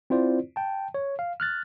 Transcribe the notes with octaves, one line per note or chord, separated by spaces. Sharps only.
C4 E4 F4 C5 D5
G5 A5
C#5
F5
F6 F#6 A6